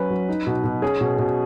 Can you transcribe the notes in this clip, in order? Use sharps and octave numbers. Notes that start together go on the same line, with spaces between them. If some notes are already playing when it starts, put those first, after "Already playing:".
Already playing: F#3 C#4 B4
F#3
D#4
B2
B2
C#4 G#4
B2
B2